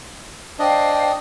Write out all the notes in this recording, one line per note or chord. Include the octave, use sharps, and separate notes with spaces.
D4 C5 D#5 F5 G5